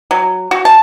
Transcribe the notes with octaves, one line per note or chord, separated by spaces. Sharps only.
F#3
F#4
A5